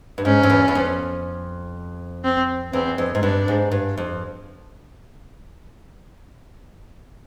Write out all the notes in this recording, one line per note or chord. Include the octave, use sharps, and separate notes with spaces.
G2
G#2 C#4
F2
E2
E2
F2
C4
E2 C4
F2
G#2
G2 D4
G#2
G2
F2